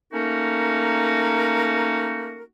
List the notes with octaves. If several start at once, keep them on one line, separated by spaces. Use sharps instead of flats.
A3 A#3 C#4 D#4 F#4 A#4